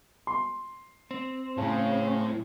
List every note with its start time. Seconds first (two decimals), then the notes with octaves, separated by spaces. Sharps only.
0.27 C6
1.11 C4
1.57 A2 C#3 A5